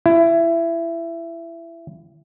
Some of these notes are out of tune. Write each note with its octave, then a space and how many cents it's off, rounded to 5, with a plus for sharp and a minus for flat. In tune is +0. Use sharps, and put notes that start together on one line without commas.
E4 +20